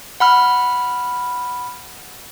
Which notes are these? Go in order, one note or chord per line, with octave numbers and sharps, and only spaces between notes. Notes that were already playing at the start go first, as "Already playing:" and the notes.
F#5 B5 F6